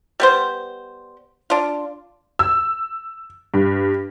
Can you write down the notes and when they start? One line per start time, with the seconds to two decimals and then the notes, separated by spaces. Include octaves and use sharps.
0.20 G3 B3 C5
1.50 D4 F4
2.39 E6
3.54 G2